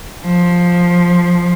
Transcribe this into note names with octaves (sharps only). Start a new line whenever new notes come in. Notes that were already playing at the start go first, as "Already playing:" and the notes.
F3